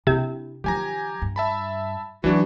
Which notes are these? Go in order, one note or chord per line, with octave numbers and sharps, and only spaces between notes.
C3 D4 E4
D#3 F3 G4 G#5 A#5
G2
E5 A5 B5
E3 F#3 D4 D#4 F#4